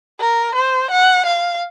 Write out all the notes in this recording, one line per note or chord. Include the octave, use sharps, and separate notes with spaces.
A#4
C5
F#5
F5